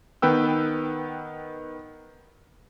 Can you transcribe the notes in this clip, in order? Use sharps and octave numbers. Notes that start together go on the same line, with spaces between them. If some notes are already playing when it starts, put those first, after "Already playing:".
D#3 B3 B4 G5 E6